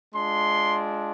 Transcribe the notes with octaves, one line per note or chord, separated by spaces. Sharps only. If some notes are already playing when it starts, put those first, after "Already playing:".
G#3 D4 F4 C6